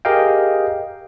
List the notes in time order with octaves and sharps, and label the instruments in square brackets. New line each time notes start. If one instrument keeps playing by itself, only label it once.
[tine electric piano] G4 G#4 A#4 D#5 F5 G5